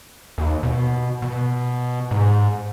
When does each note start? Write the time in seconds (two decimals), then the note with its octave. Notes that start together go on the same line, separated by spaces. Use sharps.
0.38 D#2
0.63 B2
1.22 B2
2.11 G#2